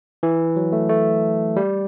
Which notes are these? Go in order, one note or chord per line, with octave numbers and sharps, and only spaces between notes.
E3
F#3
A3
A3
G3